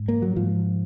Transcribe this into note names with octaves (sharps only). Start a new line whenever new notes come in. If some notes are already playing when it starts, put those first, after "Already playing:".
Already playing: G#2
A#3
F#3
G#2 F3